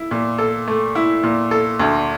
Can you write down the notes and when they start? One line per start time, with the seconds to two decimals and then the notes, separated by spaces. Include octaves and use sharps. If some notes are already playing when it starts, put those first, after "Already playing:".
Already playing: E4
0.11 A#2
0.38 A4
0.68 A3
0.95 E4
1.23 A#2
1.51 A4
1.80 D2